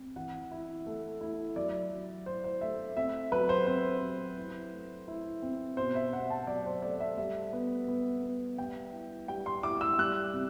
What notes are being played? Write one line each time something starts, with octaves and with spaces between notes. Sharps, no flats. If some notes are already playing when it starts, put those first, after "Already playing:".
Already playing: C4
E3 F#5
E4
A3
E4
F#3 D5
F#3
E4 C5
C5
A3 E5
C4 E5
F#3 B4
C5
C4 C5
F#3
E4
A3
E4
C4
B2 C5
E5
B2 F#5
A5
F#3 D5
C5
A3 D5
E5
G3 E5
B3
B3
B3
G3 G5
E4
G3 G5
C6
E4 D6
E6
G3 F#6
C3